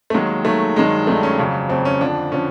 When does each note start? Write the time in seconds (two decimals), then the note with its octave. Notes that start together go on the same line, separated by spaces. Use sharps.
0.10 A3
0.14 D#2 D#3 F#3 G#3
0.45 D#2 D#3 F#3 A3
0.76 G2 D#3 F#3 G#3
1.07 G2 D#3 F#3 A3
1.23 C#4
1.38 F2 C#3 F#3
1.69 F2 C#3 F#3 C4
1.85 C#4
2.01 F2 D3 F3 D4
2.32 D3 F3 C#4